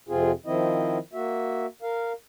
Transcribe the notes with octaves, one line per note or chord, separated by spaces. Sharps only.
F2 C3 C4 F4 G#4
D#3 F3 C4 E4 D#5
A#3 F#4 E5
A#4 F5